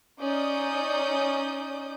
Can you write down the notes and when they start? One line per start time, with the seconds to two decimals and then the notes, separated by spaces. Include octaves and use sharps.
0.20 C#4 D#4 D5 D#6 G6